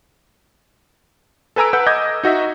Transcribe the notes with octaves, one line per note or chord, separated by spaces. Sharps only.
A4 B4 G#5 A#5 E6 D7
B4 F#5 E6 G6
D#5 D6 D#6 G6 G#6
D#4 F#4 D#5 E5